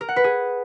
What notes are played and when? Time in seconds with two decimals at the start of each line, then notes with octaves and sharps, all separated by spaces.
0.01 A#4
0.09 F#5
0.16 B4
0.24 G#4